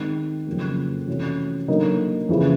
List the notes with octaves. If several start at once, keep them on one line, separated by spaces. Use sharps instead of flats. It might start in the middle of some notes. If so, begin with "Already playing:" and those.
Already playing: D#3 G#3 C4
F2 C#3 F#3 A#3
C3 E3 A3 C#4 F#4
D3 F#3 A#3 D#4
F2 C#3 E3